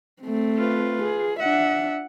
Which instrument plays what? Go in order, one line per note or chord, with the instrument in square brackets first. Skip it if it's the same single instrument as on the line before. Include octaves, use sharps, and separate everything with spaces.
[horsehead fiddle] A3 C4
[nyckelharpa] F4 B4
[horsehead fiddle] G#4
[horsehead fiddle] D4 E5 [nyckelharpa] F#5